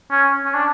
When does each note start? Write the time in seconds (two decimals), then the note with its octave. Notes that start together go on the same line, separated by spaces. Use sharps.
0.11 C#4
0.45 C#4
0.55 D4